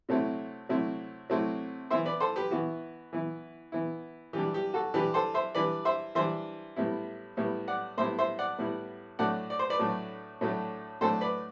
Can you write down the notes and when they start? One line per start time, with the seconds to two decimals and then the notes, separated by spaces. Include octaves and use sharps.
0.09 C3 F#3 A3 C4 E4
0.69 C3 F#3 A3 C4 E4
1.30 C3 F#3 A3 C4 E4
1.90 E3 B3 E4 C5 E5
2.06 B4 D5
2.20 A4 C5
2.36 G4 B4
2.51 E3 B3 E4 F#4
3.13 E3 B3 E4
3.72 E3 B3 E4
4.33 E3 G3 D4 G4
4.54 G4
4.74 F#4 A4
4.94 E3 G3 D4 G4 B4
5.14 A4 C5
5.34 C5 E5
5.55 E3 G3 D4 B4 D5
5.85 C5 E5
6.15 E3 G3 D4 C5 E5
6.76 A2 G3 B3 E4
7.37 A2 G3 B3 E4
7.68 D5 F#5
7.98 A2 G3 B3 E4 C5 E5
8.19 C5 E5
8.39 D5 F#5
8.59 A2 G3 B3 E4
9.19 A2 F#3 A3 D4 D5 F#5
9.50 D5
9.59 C5
9.70 B4 D5
9.79 A2 F#3 A3 D4
10.41 A2 F#3 A3 D4
11.01 A2 F#3 A3 D4 A4 C5
11.21 B4 D5